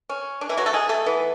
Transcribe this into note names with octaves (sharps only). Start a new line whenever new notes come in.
C#4
D4
E3 E4
F#3 F#4
A3 A4
G#3 G#4
A3 A4
E3 B3